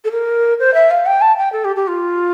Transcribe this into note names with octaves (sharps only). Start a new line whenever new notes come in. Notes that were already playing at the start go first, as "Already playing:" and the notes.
A4
A#4
C5
E5
F5
G5
A5
G5
A4
G4
G4
F4